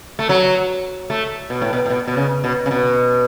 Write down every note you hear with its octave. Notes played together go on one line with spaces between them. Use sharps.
A3
F#3
A3
B2
A2
B2
A2
B2
B2
C#3
B2
C#3
B2